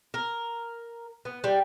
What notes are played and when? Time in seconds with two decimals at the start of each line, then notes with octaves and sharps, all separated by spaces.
0.14 A#4
1.25 B3
1.44 G3